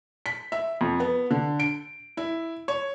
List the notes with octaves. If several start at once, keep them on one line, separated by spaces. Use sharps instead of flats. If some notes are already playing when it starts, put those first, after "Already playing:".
B6
E5
F2
B3
D3
D7
E4
C#5